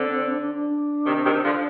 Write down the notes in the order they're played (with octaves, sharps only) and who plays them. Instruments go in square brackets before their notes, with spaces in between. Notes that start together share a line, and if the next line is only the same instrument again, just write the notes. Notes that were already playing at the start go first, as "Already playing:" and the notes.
Already playing: [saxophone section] D3 [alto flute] C4
[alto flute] D4
D4
D4
[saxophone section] C3 D#3
C3 D#3
[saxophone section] D3 F3 [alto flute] D4